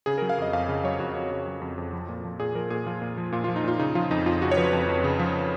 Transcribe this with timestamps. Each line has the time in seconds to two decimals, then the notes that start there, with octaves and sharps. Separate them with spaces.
0.06 C#3 G#4
0.18 A#4
0.22 F#3
0.29 F5
0.38 F2 D#5
0.53 F2 F5
0.69 C#3
0.84 F#3 C#5
1.00 F2 F#4
1.15 F2
1.31 C#3
1.47 F#3
1.62 F2
1.78 F2
1.93 F3
2.09 A#2
2.24 F3
2.40 A#2 G#4
2.55 F3 A#4
2.70 A#2 G#4
2.86 F3 F4
3.02 A#2
3.17 F3
3.32 A#2 F4
3.44 F4
3.48 F3
3.56 D#4
3.64 A#2 F4
3.79 C#3 D#4
3.95 F3 F4
4.11 F2 D#4
4.26 F2 F4
4.42 C#3 F#4
4.51 C#5
4.57 F3 B4
4.73 F2
4.89 F2
5.04 C#3
5.19 F3